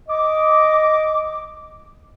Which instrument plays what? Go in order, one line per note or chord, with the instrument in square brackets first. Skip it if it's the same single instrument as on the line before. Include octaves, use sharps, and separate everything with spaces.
[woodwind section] D#5 D6